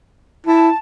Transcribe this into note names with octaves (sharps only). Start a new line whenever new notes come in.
E4 A5